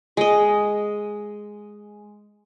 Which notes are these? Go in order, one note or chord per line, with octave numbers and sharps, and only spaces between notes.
G#3 D#5